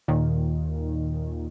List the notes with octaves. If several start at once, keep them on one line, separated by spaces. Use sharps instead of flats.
D#2 A#2 D#3